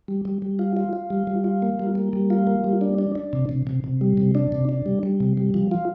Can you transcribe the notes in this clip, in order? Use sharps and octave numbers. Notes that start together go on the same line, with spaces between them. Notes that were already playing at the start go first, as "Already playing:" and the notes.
G3
G3
G3
F4
F4
F4
G3
G3
F4
A#3
G3
A#3
G3
F4
A#3
G3
D4
D4
D4
C3
C3
C3
C3
G3
C3
D4
C3
D4
G3
G3
C3
G3
F3
F4